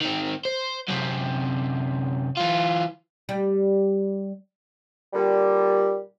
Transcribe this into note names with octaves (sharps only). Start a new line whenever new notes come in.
D#3 C4
C5
F#2 C3
E3 F4
G3
A#2 D3 G3